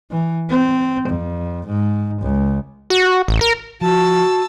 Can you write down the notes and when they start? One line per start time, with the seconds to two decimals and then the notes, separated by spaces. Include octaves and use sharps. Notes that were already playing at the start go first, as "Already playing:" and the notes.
0.11 E3
0.49 C4
1.08 F2
1.66 G#2
2.21 C#2
2.90 F#4
3.28 A1
3.41 A#4
3.81 F3 F#4 A5 E6